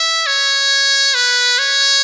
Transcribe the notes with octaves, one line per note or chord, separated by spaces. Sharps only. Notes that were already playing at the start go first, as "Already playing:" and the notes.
Already playing: E5
C#5
B4
C#5